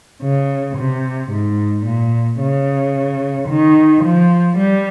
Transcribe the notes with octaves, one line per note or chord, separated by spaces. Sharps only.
C#3
C3
G#2
A#2
C#3
D#3
F3
G3